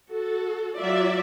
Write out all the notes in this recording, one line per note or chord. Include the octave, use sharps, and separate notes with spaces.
F#4 A4
F#3 F4 D5 E5